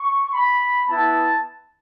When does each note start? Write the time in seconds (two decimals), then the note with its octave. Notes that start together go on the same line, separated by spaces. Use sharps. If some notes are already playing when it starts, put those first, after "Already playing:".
Already playing: C#6
0.33 B5
0.88 B3 E4 A5